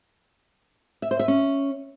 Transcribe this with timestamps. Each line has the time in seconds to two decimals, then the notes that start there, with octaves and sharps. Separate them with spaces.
1.02 E5
1.11 C5
1.19 E5
1.28 C#4